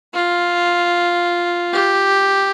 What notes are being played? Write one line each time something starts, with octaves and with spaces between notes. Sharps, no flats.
F4
G4